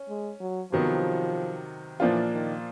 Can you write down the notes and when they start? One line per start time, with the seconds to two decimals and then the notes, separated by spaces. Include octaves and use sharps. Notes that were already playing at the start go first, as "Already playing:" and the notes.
Already playing: C#4
0.09 G#3
0.40 F#3
0.72 C3 D#3 F3 F#3 B3
2.00 A#2 E3 F3 A#3 D4 F4
2.33 D#3